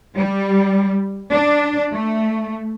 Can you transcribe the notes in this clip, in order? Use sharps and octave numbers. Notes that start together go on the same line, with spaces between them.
G3
D4
A3